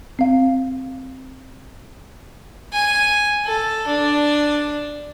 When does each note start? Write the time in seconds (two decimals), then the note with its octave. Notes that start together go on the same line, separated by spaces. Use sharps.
0.19 C4 F5
2.73 G#5
3.45 A4
3.87 D4